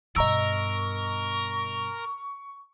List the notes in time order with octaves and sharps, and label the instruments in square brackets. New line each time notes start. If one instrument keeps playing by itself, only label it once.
[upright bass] G2 B2 [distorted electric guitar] A#4 [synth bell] D#5 A#5 E6 [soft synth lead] C#6